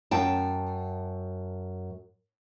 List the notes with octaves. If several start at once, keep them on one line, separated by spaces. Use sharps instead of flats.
F#2 G5 A5